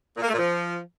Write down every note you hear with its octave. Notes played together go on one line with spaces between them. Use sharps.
A#2
A#3
A3
A#2
F3